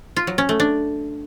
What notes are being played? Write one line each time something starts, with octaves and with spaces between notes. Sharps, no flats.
F4
F#3
C#4
A3
D4